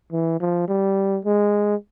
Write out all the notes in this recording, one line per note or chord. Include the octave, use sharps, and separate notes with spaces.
E3
F3
G3
G#3